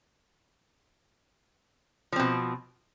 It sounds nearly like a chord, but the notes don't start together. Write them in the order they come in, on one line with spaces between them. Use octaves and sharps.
F3 C4 B2